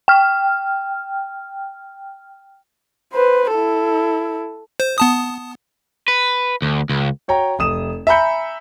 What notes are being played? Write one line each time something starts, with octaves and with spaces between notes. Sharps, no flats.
G5 F6
B4 C5
E4 A4
C5
B3 A5 D#6
B4
D2
C#2
F#4 C#5 G5 A#5
F1 D#6 E7
E5 G#5 A#5 B5 G6 C#7